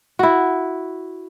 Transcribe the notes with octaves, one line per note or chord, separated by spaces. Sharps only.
E4 F#4